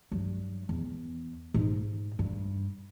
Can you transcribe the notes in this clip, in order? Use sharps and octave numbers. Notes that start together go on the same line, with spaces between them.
G2 F#3
E2
G#2 D#4
G2